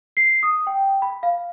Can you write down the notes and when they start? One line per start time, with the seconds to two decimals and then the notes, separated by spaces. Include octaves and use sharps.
0.17 C7
0.43 D#6
0.67 G5
1.02 B5
1.23 F5